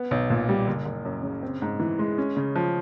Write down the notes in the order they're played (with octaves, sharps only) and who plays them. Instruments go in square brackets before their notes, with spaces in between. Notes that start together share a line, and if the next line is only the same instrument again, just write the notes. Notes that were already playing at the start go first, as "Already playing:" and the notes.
Already playing: [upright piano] B3
B1
A#2
G3
F#1
F#1
F#2
C#3
C4
G#2
E3
G#3
C#4
C#3
F3